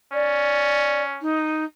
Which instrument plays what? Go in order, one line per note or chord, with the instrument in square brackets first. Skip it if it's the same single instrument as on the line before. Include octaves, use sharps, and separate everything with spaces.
[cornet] C#4 [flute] D5
[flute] D#4